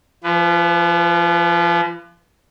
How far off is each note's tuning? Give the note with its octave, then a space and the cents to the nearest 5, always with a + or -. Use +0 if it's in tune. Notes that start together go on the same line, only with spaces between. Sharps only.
F3 -30 B4 +15